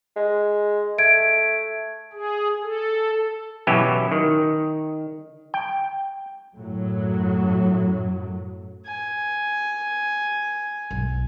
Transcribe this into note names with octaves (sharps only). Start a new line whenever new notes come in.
G#3
A3 G#6 D7
G#4
A4
B2 E3 F#3 C#4 E4 G4
D#3
G5
F#2 A2 F#3
G#5
B1